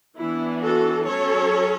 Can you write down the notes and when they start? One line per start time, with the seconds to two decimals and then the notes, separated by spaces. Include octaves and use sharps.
0.18 E3 B3 D4 E4
0.62 F#4 A4
1.06 F#3 C#4 A4 C#5